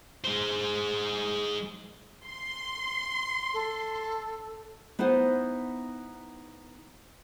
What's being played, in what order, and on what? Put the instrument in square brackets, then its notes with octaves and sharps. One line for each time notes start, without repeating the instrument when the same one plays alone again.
[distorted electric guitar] G#3 C5
[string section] C6
[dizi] A4
[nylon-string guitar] B3 D#4 E4 C5 F#5